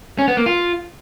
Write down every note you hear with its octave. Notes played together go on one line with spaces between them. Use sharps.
C#4
B3
A#3
F4